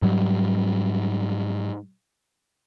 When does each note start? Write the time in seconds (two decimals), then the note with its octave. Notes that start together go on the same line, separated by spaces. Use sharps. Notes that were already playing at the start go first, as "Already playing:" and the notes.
0.02 G#2 F#3 G3